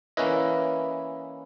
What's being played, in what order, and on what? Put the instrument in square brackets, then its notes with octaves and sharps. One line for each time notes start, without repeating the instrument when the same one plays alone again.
[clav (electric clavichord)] E3 A#3 C#4 E4 B4 D#5